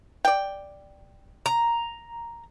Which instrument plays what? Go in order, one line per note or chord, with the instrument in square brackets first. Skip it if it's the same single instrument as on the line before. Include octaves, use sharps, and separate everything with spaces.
[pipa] D5 G5
[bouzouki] A#5